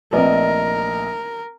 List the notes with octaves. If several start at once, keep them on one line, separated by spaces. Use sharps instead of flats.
A#1 A3 C4 A#4 B4 D5 D#5